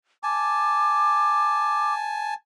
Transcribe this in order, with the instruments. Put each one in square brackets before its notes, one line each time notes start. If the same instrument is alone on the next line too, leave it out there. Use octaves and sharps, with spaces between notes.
[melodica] G#5 A5 [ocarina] D6